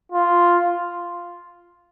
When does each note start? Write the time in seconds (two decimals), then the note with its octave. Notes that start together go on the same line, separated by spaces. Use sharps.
0.12 F4